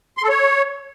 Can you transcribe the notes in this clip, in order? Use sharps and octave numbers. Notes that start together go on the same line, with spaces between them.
C6
A4
C#5